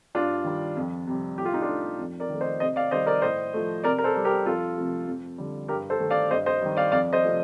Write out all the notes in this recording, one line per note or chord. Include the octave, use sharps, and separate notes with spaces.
G2 D4 F4
D#3 G3
F2
C3 G3
A2 G4
F4
D#4
D4 F4
A3
F2
A#4 D5
D#3 A3
C5 D#5
C3 C5 D#5
D5 F5
D#3 G3 C5 D#5
A#4 D5
A2 C5 D#5
F3 A3
C3 A#4 D5
A#4
A4 C5
G3
G4 A#4
F2 F4 A4
C3 F3 A3
F2
D3 G3
G2 G4 A#4
A4 C5
D#3 A3
D5 F5
G2 C5 D#5
C5 D#5
D#3 G3
D5 F5
F2 D5 F5
C5 D#5
C3 F3 A3